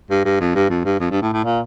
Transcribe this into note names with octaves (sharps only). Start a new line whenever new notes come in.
G2
G2
F2
G2
F2
G2
F2
G2
A2
A2
A#2